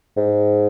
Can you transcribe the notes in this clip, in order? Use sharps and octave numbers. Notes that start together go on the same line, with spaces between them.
G#2